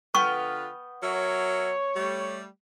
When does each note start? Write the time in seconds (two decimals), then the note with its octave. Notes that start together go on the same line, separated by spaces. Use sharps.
0.15 D3 B3 F4 B4 G5 C#6 F6
1.02 F#3 A#4 C#5 E5
1.96 G3 A3